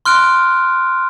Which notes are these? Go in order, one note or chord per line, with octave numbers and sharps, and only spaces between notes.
C6 F6 F#6 D7